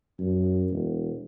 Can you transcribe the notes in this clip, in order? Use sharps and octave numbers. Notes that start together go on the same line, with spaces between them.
F#2
E1